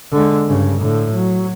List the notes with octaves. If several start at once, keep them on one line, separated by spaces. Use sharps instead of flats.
D3 G#3
G2 C#3
A2 D3
F#3